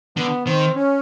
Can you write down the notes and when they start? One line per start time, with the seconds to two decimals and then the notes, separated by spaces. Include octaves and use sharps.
0.17 D3 B3
0.46 D#3 C4
0.75 C#4